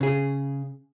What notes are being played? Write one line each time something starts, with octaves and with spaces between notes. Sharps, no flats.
C#3 G#4